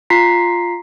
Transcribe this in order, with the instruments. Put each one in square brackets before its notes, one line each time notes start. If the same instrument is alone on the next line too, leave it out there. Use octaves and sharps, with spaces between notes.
[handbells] F4 A#5 B6 C7